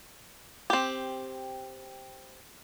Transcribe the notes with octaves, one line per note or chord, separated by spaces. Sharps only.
C4 G4